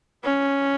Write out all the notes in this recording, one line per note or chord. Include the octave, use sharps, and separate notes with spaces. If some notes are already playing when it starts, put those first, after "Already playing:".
C#4